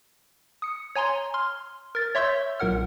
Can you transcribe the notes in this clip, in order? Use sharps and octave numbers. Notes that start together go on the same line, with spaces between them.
D#6 C#7
C#5 G#5 A#5 C6
C6 F6
A#4 A6
C#5 E5 C6 C#6 E6 G6
B1 A#2 A#4 F#5 F6